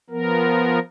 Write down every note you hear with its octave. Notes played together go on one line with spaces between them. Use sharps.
F3 B3 A#4